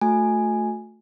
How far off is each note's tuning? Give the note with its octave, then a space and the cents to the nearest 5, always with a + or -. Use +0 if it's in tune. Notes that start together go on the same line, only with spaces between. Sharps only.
A3 +0 F#4 -40 G#5 +0